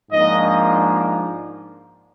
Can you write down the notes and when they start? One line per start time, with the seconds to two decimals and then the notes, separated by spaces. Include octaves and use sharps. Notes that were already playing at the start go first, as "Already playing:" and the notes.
0.11 G#2 F3 A#3 D4 D#5